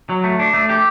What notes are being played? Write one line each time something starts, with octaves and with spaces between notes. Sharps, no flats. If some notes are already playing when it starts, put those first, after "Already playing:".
F#3
A3
D4
A3
G4